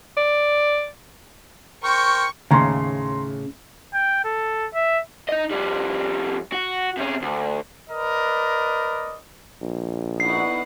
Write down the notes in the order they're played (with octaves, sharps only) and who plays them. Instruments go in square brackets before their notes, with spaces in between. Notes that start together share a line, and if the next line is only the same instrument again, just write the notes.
[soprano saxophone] D5
[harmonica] A#4 C5 G5 [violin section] C#6
[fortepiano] D#2 [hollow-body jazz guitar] A2 C#3 [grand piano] A#5 C6
[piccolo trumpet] G5
A4
E5
[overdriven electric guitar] D#4 D#5
F2 G3
F#4
C3 C#4
D2
[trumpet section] A#4 B4 D5 D#5
[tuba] A#1
[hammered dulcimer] D3 B3 C#6 [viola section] D#4 E4 F#5 [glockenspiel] C7